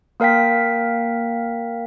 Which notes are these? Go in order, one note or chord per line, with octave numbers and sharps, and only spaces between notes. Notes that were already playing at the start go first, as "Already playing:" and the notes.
A#3 A#4 F5 G5 B6